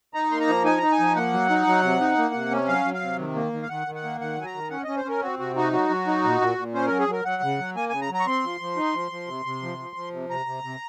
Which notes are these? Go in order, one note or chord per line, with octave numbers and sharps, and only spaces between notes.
D#4 A#5
A#3 C6
A#5
F3
D#4 G#5
D#4 A#5
G#5
F3
A#3 F#5
F#3
D#4
F#3
C3
D#4
A#3
C3
C#4
F#3 F5
F#3
F5
C3
D#3
A#3
D#3
F5
D#3 F#5
D#3
F#5
A#3
D#3 F#5
F#3 G#5
A#5
D#3
C#4 F#5
C#4 D#5
C5
C#4 A#4
C4 F#4
C3 F#4
D#4 F#4
F#3 F#4
F#3
D#4
A#2
A#2
A#2
C#4 C5
F#3 A#4
G#4
F#3 A#4
F#3 F#5
C#3
F#3
A#3 G#5
C#3 G#5
A#5
F#3
A#5
C#6
C4 C6
F3
F3
D#4
F3
F3
C3
C3
F3
F3
F3
C3
C3 A#5
C3
C3